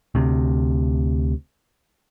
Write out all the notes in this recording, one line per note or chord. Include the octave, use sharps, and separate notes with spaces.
D2 C3